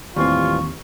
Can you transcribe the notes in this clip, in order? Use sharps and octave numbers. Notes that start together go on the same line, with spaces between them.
D#2 A2 E3 G3 C4 F4 C#6